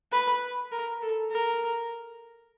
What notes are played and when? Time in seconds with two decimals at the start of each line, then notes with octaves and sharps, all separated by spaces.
0.12 B4
0.72 A#4
1.02 A4
1.31 A#4